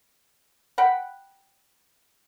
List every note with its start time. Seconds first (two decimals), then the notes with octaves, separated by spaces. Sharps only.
0.78 F#5 G5 B5